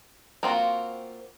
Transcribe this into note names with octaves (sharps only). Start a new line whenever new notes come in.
A#3 C4 F4 F#4